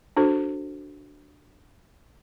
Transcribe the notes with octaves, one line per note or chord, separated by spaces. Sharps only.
D4 F#4 A4 C5